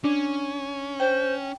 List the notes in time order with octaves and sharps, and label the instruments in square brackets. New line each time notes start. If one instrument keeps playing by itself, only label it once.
[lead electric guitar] C#4 [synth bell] D4
[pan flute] C5 [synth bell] G5